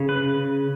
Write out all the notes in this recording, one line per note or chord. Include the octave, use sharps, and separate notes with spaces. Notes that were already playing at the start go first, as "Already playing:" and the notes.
Already playing: C#3
B4